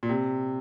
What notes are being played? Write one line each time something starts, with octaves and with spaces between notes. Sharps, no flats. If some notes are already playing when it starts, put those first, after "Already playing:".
A#2
C3